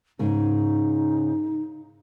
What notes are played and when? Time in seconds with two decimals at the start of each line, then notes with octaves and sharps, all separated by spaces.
0.19 G#2 C#3 D#4 A#4